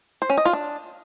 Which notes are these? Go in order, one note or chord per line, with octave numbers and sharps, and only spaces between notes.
C5
C#4
D#5
F4
D4